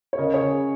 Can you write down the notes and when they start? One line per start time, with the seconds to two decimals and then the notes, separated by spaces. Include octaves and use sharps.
0.13 C#5
0.18 C#3 A#4 D#5
0.34 G#4 C#5
0.41 C#3
0.49 G#4